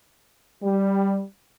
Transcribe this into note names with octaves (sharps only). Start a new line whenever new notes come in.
G3